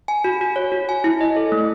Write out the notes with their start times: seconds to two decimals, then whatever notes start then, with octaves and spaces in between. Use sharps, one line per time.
0.08 G#5
0.24 F#4
0.41 F#4
0.56 C#5
0.72 F#4
0.89 G#5
1.04 E4
1.21 D#5
1.37 A4
1.52 A3